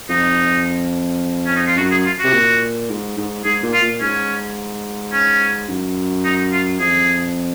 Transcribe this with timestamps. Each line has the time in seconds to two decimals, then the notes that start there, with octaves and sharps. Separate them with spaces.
0.09 F2 D#4
1.46 C#4
1.56 D#4
1.67 F4
1.77 F#2 F#4
1.91 G#4
2.06 F4
2.19 C3 F#4
2.33 A#2
2.89 G#2
3.17 G#2
3.45 G#2 G#4
3.63 A#2
3.74 F4
3.82 A#2
4.01 G#2 C#4
5.13 C#4
5.68 F#2
6.25 D#4
6.53 F4
6.80 F2 G#4